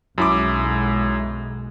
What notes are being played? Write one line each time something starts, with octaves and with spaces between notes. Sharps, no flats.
B1 F#2 G#3 E4 D6